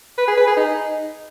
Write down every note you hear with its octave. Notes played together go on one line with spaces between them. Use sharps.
B4
G#4
B4
G#4
D#4